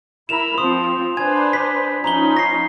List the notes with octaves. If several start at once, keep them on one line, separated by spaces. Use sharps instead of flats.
E4 A#4 B5 E7 F7
F3 C4 C6 D#6
D4 B4 C5 G#5 G#6
B6
F3 C#4 D#4 A#5 B5 G7
A#6 C7